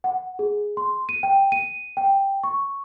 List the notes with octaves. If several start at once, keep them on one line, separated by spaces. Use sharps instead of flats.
F#5
G#4
C6
D#7
G5
D#7
G5
C#6